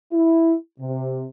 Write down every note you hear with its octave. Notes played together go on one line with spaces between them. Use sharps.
E4
C3